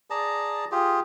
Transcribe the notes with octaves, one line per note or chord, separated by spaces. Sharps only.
G#4 D5 A5 A#5
F4 G4 G#4